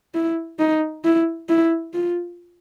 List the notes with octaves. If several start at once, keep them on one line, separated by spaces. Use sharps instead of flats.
E4
D#4
E4
E4
F4